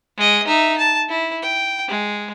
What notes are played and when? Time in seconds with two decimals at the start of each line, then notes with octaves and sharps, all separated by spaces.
0.18 G#3 D#5
0.47 D#4 E5
0.78 A5
1.09 E4
1.42 G5
1.88 G#3